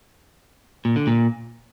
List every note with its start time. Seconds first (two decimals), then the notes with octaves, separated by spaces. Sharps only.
0.85 A#2
0.96 D3
1.07 A#2